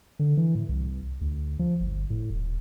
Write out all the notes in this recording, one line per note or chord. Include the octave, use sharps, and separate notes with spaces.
D3
E3
A2
C2
D2
F3
G1
A2
D#1